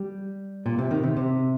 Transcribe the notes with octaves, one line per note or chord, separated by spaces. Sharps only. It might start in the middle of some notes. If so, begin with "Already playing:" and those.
Already playing: G3
A#2
C3
D#3
C3
C3